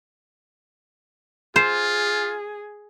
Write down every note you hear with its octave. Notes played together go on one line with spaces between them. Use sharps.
F4 G#4 C5